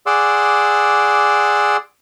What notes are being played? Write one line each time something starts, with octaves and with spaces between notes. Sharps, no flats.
G#4 D5 F#5 C6 D6 E6